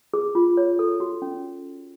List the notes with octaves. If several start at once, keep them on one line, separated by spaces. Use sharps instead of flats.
G#4
F4
C#5
A4
F#4
C#4